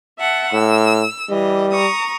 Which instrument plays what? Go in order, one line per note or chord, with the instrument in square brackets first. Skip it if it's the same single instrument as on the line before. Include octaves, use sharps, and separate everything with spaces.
[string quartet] E5 F#5 A5
[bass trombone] A2 [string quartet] E6
[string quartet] E3 D#5 [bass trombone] G3
[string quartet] A#5 C#6 D#6